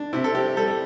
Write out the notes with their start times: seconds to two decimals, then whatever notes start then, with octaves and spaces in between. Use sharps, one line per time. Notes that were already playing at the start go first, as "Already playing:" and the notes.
Already playing: D4
0.13 C3 E4
0.24 A4
0.35 C4 G4
0.57 G3 A4